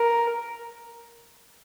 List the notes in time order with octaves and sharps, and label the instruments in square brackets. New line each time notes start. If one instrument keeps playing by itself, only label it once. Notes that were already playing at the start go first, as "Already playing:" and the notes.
Already playing: [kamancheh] A#4